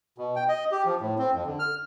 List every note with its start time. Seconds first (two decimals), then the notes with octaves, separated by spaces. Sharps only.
0.18 B2
0.36 G5
0.48 D#5
0.72 G4
0.86 F3
1.01 A2
1.18 C4
1.33 F2
1.45 D3
1.59 F6